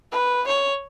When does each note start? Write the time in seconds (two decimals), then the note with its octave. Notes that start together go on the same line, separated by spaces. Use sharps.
0.12 B4
0.47 C#5